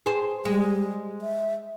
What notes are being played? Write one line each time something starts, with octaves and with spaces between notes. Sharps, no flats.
G#4 C5
G3 G#3
E5